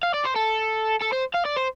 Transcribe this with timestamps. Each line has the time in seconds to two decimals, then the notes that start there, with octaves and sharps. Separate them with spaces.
0.03 F5
0.14 D5
0.25 C5
0.36 A4
1.02 A4
1.13 C5
1.34 F5
1.45 D5
1.57 C5